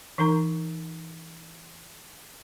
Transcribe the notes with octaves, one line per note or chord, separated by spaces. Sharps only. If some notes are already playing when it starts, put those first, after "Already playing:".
E3 D#4 A#4 A#5